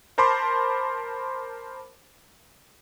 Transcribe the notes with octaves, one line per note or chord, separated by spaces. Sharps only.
A#4 C5 A5 B5 C6 D6